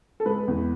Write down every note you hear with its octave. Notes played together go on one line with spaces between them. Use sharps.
A4
G#3 B4
E2